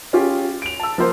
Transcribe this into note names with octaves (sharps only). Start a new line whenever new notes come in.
C#4 F4 G4 G#4
D7 F7
A5 E6
F3 A#3 C5